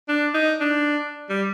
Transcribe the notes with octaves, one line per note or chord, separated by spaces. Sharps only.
D4
D#4
D4
G3